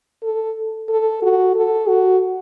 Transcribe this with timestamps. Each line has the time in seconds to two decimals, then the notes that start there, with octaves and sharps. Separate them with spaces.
0.23 A4
0.89 A4
1.22 F#4
1.55 A4
1.88 F#4